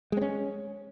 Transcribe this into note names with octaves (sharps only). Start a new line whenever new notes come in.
G#3 C4 C#4